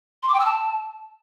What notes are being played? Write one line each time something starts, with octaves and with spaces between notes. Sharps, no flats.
C6
D6
G5
E6
A5